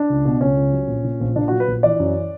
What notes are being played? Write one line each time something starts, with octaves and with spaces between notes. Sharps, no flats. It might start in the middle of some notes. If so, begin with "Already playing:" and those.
Already playing: D4
C#2
B2
C#2 C#4
C#2
F#3
A#1
A#2
A#1
A#2 D4
F#3 F#4
B4
A#1
E3 D5
F#2